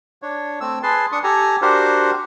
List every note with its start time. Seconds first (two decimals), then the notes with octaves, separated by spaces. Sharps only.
0.22 D4 C#5
0.61 A3 C4 E6
0.83 G#4 B4 A5 C6
1.12 D4 C#6 D#6
1.24 G4 A4 G#5 A#5
1.62 D4 F#4 G4 A#4 C5 F#5